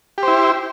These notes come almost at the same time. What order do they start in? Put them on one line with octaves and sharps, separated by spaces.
G4 C5 E4